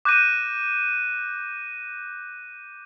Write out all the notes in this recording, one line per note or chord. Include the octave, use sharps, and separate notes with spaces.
D6 F#6 G6 A#6 D#7